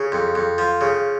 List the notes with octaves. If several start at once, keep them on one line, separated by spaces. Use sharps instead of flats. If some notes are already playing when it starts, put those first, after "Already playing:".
Already playing: C#3
F2
F2
F3
C#3